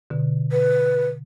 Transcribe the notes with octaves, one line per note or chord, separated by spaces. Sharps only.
B2 D3
B4